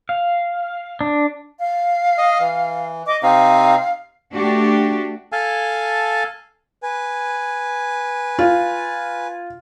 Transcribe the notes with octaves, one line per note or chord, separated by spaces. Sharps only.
F5
D4
F5
D#5
E3
D#5 D6
C3 C4 D#4 F5
A3 D4 F#4 G4
A4 F5 G#5 A5
B4 G#5
F4